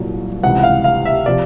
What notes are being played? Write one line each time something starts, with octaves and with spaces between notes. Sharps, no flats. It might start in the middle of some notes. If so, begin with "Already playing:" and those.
Already playing: C2 A#2 F#3
C#2 C3 E3 F#5
F#5
F5
F5
E5
C3 F3 D5